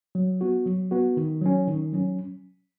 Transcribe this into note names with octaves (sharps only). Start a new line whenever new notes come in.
F#3
B3 F#4
F#3
B3 F#4
D#3
F#3 C#4
D#3
F#3 C#4